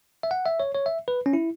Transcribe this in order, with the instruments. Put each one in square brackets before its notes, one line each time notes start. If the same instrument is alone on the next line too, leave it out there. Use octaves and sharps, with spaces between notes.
[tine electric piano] E5
F#5
E5
C#5
C#5
E5
B4
C#4
E4